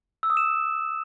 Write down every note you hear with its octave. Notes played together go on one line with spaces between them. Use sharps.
E6
D#6
E7